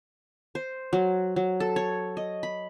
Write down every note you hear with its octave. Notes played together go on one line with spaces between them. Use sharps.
C5
F#3
F#3
A4
C#5
D#5
B5